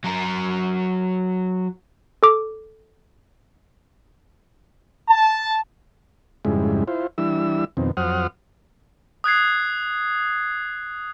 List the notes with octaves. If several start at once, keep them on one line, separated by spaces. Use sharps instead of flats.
F#3 A#4
A4 D6
A5
F2 G#2 C#3 G3 G#3 E4
E4 F4 C5
E3 G3 D4 E4 E6
F2 B2 D#3 C4
F2 F#3 C5 F#5 D#6 F6
D#6 F#6 G#6 C7